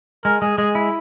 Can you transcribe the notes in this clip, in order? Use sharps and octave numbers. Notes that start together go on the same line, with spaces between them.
G#3 A#4
G#3 G#4
G#3 G#4
E4